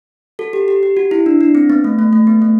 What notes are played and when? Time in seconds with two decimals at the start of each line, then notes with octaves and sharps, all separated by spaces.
0.39 F#4 A4
0.53 G4
0.68 G4
0.83 G4
0.97 F#4
1.11 E4
1.26 D4
1.41 D4
1.55 C4
1.70 B3
1.84 A3
1.99 A3
2.13 A3
2.27 B3
2.42 A3